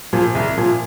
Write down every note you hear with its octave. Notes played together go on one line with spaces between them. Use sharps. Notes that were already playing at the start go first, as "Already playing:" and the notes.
A#2 F3
C2
A#2 F3